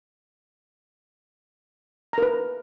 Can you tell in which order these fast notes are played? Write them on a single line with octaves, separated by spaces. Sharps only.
A#5 A#4 B4